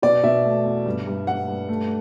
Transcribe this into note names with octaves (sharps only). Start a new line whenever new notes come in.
B2 D5
B2 E5
A3
E2
G2
G2
G2 F#5
G2
A3